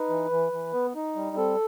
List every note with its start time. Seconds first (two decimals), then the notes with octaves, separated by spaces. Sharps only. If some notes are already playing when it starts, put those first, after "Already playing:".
Already playing: D#4 B4
0.09 E3
0.31 E3
0.52 E3
0.73 B3
0.95 D#4
1.16 G3
1.37 C4 A4